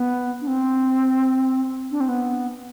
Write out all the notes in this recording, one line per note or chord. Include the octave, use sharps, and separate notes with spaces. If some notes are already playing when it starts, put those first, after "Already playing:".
Already playing: B3
D4
C4
D4
C4
B3